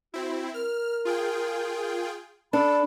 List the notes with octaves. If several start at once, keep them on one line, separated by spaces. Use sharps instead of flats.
C4 E4 F#4
A#4 F6
F4 G#4 G5
D4 A4 B5